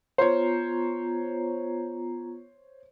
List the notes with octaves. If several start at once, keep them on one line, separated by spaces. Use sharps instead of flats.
B3 F4 C5 C#5 A#5